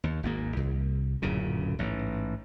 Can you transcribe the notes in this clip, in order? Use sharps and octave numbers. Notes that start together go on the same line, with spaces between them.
D#2
G#1 G#2 A#3
C2
D1 F#2 A#2 C#3
A1 G#2